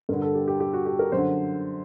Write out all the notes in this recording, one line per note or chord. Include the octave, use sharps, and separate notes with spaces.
G2 D3 A#4
A4
G4
G4
G4
F#4
G4
A#4
F#2 D3 C5